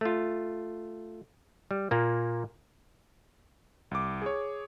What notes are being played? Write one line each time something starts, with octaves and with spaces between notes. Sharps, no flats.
A3 F4
G3
A#2 A#3
C2 D6
G#4 C#5